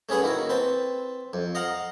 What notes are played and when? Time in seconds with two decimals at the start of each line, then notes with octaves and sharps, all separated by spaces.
0.09 A3 C#4 G#4 B4 F#5
0.22 D#3 A#3 E4 F#4
0.49 C4 B4 A5
1.33 F2
1.55 D#5 F5 F#5 A#5